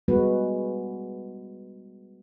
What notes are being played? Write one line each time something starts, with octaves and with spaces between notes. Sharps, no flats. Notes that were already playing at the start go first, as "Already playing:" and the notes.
G3 G#3 B3 F#4 B4